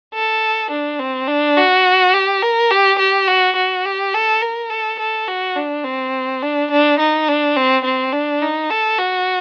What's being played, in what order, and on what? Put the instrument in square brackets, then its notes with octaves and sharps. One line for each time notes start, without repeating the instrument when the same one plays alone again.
[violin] A4
D4
C4
D4
F#4
G4
A#4
G4
G4
F#4
F#4
G4
A4
A#4
A4
A4
F#4
D4
C4
D4
D4
D#4
D4
C4
C4
D4
D#4
A4
F#4